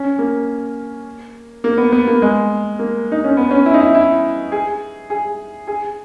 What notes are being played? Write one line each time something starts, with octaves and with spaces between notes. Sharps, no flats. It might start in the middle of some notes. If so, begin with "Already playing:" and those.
Already playing: C#4
A#3
A#3
B3
B3
A#3
G#3
A#3
D#4
C#4
B3
C#4
E4
D#4
E4
E4
G#4
G#4
G#4